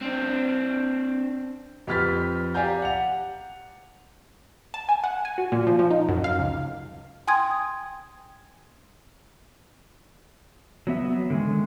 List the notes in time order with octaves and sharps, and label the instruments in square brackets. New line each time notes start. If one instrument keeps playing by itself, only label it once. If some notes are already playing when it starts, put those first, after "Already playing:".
[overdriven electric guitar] C4 D4
[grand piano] F2 G4 B4 F6 A6 B6
G4 D5 F5 G#5 A#5 G6
F#5 F7
[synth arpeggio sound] A5
G#5
F#5
G#5
F#4
A#2
F3
F3
D#4
F#2
F5
C#2
[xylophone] G5 G#5 C6 D#6 G#6
[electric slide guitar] F#3 B3 E5
D3 D#3 G#3